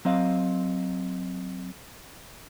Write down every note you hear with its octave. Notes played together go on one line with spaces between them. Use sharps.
F#3 C4 D#5 F5